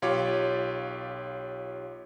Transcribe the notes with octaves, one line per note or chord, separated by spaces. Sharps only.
B1 F4 G4 C#5